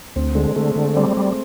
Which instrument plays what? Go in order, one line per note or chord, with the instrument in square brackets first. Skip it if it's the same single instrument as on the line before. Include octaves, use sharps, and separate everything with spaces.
[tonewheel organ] D2 [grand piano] C4
[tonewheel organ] D3 [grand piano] G#3
[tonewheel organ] D3 [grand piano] A3
[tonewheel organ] D3 [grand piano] A3
[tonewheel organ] G3 [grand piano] C4
[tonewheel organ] G3